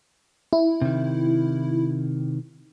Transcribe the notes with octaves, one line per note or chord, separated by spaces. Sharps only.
E4
C3 D#3